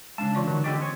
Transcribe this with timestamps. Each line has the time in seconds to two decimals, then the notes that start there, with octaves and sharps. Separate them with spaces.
0.18 C#3 G#3 D4 A5
0.35 E3 F4 D5
0.47 D3 D#3 F#3
0.64 D3 F4 G4 D5 D#5
0.80 C4 G#4 C#5